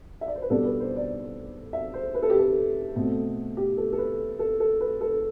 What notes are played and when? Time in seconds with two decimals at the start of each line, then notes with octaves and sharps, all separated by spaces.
0.21 E5
0.28 D5
0.36 C5
0.42 B4
0.50 B2 G3 B3 D4 A4
0.65 B4
0.80 C5
0.96 D5
1.73 E5
1.94 C5
2.14 B4
2.22 A4
2.30 G4
2.38 A4
2.96 B2 A3 C4
3.57 G4
3.77 A4
3.92 A4
3.98 B4
4.39 A4
4.60 A4
4.80 B4
5.01 A4